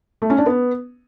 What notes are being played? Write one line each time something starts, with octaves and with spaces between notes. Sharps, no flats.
A3
C#4
D4
B3